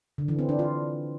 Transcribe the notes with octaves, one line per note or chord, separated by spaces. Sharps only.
D3
E3
C4
D4
F4